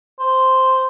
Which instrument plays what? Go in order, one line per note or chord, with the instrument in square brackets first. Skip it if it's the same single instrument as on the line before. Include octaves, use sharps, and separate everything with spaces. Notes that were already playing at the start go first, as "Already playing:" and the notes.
[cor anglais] C5